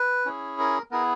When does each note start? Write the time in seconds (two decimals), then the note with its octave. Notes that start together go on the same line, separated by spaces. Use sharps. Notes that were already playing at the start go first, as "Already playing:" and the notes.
Already playing: B4
0.26 C#4 E4 G#4
0.59 A#4
0.91 B3 E4 G#4 A#4